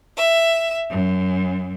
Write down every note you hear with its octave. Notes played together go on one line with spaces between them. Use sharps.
E5
F#2